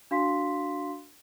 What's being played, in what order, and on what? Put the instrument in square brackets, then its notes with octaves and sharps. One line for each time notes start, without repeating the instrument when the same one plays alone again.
[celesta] D4 F#4 F5 C6 B6